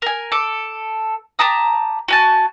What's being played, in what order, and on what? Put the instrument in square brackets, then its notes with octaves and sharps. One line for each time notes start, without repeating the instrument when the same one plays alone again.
[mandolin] A#4 G#5
A4 D6
G4 A5 A#5 D#6
F#4 G#5 A5